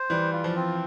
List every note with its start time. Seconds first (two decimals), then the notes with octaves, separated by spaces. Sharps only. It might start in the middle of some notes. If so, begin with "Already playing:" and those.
Already playing: C5
0.10 E3 G3
0.32 F4
0.44 F3
0.56 C4